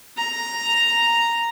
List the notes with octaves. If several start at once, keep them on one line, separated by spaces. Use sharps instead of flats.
A#5